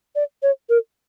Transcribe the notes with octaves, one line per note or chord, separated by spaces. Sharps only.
D5
C#5
A#4